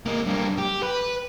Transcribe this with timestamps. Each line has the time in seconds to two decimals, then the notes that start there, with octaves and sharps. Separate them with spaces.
0.05 G#3 A#3
0.27 G2 A#3
0.58 G4
0.83 B4